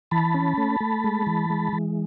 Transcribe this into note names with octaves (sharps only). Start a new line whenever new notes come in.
E3 A5 B5
C#4
A3
A3
G#3
E3
G#3
E3